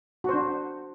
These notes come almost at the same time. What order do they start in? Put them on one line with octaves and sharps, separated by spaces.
F#4 C5 D4